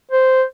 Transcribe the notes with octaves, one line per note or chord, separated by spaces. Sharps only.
C5